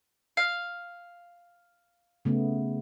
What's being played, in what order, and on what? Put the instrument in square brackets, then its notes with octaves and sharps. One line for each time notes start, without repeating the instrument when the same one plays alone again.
[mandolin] F5
[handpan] C#3 A3 B3